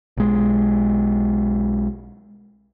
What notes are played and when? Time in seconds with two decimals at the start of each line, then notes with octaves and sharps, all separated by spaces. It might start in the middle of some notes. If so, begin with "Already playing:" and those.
0.17 B1 G#3